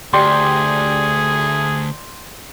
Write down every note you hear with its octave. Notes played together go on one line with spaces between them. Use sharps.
D2 G4 G#4 D5 C6